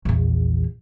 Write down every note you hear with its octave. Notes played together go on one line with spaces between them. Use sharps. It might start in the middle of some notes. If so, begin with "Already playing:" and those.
A#1 E2